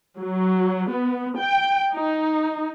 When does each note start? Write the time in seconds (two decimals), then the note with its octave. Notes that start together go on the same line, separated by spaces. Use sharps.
0.19 F#3
0.91 B3
1.40 G5
1.94 D#4